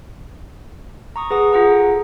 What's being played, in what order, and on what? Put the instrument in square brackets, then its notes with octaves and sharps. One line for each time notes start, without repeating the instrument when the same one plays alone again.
[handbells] A#5 C#6 D#6
G#4 B4 F#5 D#6
F4 G#4 F#5 A#5
A4